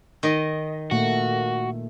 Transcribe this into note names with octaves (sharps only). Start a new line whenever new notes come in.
D#3 D#5
A#2 A3 A#3 F#4